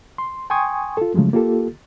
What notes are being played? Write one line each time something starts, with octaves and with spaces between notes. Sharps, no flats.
C6
G5 G#5 C6 C#6 D#6 G#6
F4 A4
C#3 F3 F#3 G#3 A3
A#3 F4 G4 A4